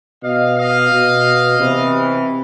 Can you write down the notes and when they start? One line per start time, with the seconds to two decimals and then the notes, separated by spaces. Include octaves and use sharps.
0.22 B2 D#5 F5
0.56 D#5 F5
0.91 B2
1.59 C3 E3